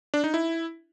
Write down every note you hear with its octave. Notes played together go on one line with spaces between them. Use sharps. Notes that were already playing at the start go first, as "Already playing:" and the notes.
D4
D#4
E4